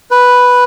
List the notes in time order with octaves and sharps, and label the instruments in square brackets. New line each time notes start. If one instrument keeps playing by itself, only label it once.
[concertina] B4